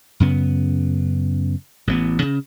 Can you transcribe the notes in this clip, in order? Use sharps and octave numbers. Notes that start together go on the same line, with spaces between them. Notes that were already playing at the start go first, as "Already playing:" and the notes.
F#2 C#3 B3
A1 E3 F#3 B3
C#3